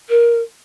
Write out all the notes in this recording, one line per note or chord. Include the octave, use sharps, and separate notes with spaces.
A#4